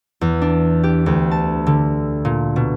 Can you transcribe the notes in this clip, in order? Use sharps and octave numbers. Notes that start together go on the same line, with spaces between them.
E2
D4
G4
D2
A5
D3
A#2
B2